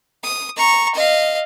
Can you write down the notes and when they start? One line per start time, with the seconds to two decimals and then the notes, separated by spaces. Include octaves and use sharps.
0.23 D#6
0.57 A#5 C#6
0.95 D#5 F5